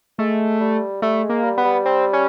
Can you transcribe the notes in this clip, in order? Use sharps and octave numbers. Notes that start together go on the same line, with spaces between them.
G#3 A3
G3
G3 A3
G#3
A#3
G3
B3
G3
C4
C#4